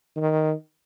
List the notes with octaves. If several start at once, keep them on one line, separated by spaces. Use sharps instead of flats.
D#3